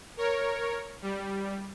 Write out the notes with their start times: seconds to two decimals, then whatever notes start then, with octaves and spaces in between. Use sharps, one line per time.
0.17 A#4 C#5
1.02 G3